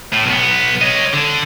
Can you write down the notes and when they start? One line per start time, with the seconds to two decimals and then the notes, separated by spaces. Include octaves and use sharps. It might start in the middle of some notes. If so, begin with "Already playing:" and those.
0.13 A2
0.26 B1 B3
0.81 C#5 D#5
1.13 D3